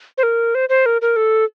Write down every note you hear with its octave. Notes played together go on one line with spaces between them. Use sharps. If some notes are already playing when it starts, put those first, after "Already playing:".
C5
A#4
C5
C5
A#4
A#4
A4